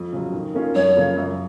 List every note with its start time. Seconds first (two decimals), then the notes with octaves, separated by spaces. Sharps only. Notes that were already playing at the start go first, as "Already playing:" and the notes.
Already playing: F2
0.13 C#3 F#3
0.33 D#3
0.55 A#3 C#4 F4
0.75 F#2 C#5
0.96 C#3 F3 A#3 F4
1.18 F#2